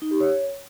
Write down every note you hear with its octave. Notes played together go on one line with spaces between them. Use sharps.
D#4
G4
C#5